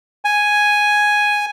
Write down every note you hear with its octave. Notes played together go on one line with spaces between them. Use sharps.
G#5